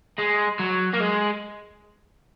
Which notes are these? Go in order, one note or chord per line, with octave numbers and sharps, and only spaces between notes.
G#3
F#3
A#3
G#3